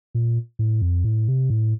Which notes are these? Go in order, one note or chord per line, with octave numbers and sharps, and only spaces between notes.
A#2
A2
F2
A2
C3
A2